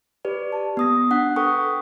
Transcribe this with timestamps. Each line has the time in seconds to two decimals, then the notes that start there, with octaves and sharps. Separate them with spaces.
0.25 G4 B4 D5
0.52 A5
0.77 B3 D#6 A#6
1.10 D4 F#5 F#6 B6
1.36 A4 B4 G5 C#6 D#6